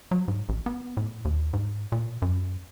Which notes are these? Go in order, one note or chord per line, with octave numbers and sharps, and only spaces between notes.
F#3
G#2
A1
B3
A2
D#2
G#2
A#2
F#2